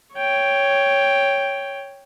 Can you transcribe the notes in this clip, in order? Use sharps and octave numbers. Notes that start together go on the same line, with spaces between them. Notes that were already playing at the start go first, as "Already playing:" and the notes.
C#5 G5